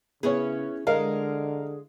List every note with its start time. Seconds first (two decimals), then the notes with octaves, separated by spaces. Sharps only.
0.23 C#3 B3 C#4 E4 G#4 C#5
0.87 D3 G#3 A#4 D#5 F5